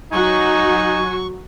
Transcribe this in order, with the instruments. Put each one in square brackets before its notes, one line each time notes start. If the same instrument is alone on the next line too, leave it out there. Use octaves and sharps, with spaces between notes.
[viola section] F#3 F#4 [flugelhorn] D#4 [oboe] G#5 [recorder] C#6